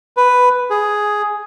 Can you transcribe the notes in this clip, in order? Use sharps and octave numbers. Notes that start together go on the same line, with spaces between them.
B4
G#4